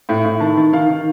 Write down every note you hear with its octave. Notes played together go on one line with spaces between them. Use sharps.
A2
A2
D#3 A5
D#3
D#3 F5
D#3